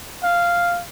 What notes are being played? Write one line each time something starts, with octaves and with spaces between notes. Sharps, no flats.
F5